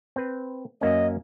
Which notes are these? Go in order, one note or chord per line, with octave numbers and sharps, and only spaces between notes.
C4 B4
F#2 A#3 C#4 D#5